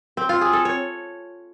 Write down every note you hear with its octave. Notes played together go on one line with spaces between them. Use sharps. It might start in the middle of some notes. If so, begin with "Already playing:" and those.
C4
F4
G#4
A4
C#5